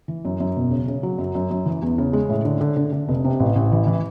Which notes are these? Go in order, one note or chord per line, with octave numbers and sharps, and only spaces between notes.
E3
F#2
F#2
E1
C#3
C#3
F#3
F#2
F#2
F#2
E3
E2
C#3
G#3
A2
D3
D3
D3
D3
F1
C3
A1
A1
E3
E3